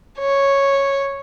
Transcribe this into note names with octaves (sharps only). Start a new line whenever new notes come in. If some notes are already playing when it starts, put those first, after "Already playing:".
C#5